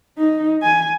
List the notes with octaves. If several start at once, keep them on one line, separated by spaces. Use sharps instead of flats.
D#4
G#5